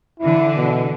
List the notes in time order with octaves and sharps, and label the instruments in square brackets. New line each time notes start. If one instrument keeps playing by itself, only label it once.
[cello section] D3 E3 [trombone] E4
[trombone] B2